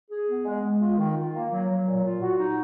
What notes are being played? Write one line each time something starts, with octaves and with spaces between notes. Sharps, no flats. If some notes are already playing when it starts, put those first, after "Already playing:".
G#4
B3
G#3
G#3
F4
D#3
F4
A#3
F#3
F#3
A#2
F4
F#4
D#4